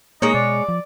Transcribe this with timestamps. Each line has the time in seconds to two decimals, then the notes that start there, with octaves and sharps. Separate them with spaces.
0.22 G#3 A#3 D#4 C#5
0.34 B2 D5
0.69 F3